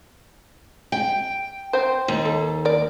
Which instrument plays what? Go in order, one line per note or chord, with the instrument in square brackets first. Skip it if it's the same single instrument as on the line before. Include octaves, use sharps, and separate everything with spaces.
[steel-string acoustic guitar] G5
[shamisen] C4 C5
[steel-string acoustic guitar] D#2
[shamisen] A4
A#4 D5